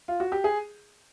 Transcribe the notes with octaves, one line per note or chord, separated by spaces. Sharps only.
F4
F#4
G4
G#4